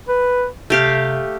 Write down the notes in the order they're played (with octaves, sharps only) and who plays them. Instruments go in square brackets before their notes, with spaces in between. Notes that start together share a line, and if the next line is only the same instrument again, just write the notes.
[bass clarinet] B4
[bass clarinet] C3 [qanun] A3 G4 F5